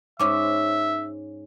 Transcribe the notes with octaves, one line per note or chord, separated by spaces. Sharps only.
G#2 C#4 C5 C#5 E5 D6